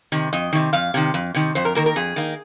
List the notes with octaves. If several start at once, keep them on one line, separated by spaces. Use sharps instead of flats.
C3 D#3
F2 D#5
C3 D#3
F2 F5
C3 D#3
F2
C3 D#3
F2 C5
A#4
D#3 A#3 A#4
A#4
F2 G#4
D#3 A#3